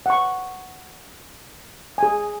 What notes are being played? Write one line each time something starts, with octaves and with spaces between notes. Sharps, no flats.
F#5 C#6
G#4 G#5